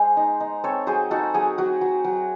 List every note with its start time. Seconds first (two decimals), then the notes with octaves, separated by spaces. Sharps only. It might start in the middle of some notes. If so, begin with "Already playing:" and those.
Already playing: G#3 G#4 C5
0.17 D#4
0.40 D#4
0.64 C4 A4 C#5
0.87 F#3 G#4 C5
1.11 D#4 F#4 A4
1.34 F#3 G#4
1.58 F#3 F#4
1.81 F#3
2.04 F#3